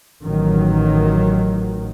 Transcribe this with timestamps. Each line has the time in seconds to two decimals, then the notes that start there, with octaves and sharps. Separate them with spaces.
0.23 A1 D#3 F#3